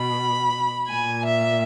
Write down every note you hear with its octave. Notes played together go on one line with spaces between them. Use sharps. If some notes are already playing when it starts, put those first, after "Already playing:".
Already playing: B2 B5
A#2 G#5
E5